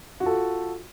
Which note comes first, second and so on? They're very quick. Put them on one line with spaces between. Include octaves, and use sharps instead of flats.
F#4 F4 A4